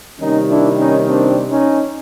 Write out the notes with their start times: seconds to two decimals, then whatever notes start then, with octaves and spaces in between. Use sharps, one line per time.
0.20 C3 D#3 G3 A#3 C#4 D#4
0.49 D4 E4
0.78 C#4 D#4
1.07 C4 D4
1.50 C#4 D#4